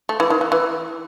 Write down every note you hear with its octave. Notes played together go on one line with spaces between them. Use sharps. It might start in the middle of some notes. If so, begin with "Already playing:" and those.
A3
E3
D#3
E3
E3